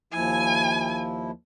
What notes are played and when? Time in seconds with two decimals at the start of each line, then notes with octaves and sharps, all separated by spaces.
0.13 D#2 F3 E4 G#5